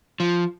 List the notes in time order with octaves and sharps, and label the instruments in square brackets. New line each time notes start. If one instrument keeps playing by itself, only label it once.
[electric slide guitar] F3